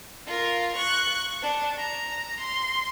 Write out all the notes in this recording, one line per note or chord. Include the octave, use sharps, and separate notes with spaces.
F4 A#4
C#6 F#6
D4
A#5
C6